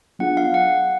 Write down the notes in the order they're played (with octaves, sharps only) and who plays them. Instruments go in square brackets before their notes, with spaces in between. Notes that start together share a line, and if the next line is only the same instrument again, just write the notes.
[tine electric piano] F#3 B3 D4 F4 G#4 [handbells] F#5
[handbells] F5
F#5